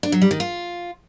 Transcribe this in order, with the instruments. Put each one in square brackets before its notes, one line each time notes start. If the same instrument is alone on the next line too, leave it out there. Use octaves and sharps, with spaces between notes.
[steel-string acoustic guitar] D4
F#3
G3
D#3
F4